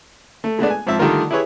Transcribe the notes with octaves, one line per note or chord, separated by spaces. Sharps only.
A3
G#3 A3 B3 D4
G#5
G#2 F3 C4 E5 A5
D3 D#3 G3 A3 F4 A#4
E4 G4 G#4 B4 C#5 E5